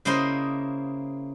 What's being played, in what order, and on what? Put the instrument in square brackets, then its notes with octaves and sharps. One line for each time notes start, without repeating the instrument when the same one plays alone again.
[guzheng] C#3 A#3 E4 C5 D#5 C6